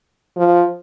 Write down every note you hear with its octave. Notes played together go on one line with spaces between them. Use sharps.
F3